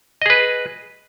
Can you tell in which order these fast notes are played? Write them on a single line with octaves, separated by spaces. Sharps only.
D#5 G#4 B4